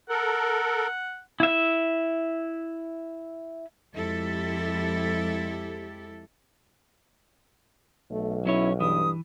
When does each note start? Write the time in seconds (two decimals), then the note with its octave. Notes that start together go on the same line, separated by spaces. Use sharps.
0.09 A4 A#4 F#5
1.40 E4 E5
3.94 F2 G#3 E4 G4 A4
8.11 B1 A3
8.45 F#3 C#4 E4 C#5
8.80 G2 E3 D#6